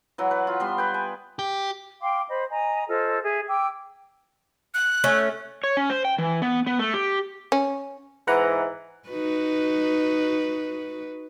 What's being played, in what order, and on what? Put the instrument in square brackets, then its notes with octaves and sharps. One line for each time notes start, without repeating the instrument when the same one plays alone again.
[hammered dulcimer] E3 F#3 F#5
B4
F4
G3 B3 C6
B4 G5
G#5
[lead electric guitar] G4
[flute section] F5 G5 C6 D6
C5 D#5 B5
D#5 G#5 A#5
F4 A4 C5 D#5
G#4 E5
G5 D6 E6
[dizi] F#6
[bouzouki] A3 C#4
[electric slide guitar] C#5
C#4
C5
G5
E3
B3
B3
A3
G4
[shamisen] C#4
[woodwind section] G#2 E3 [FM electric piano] B4 F#5 A#5
[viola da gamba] D#4 F#4 B4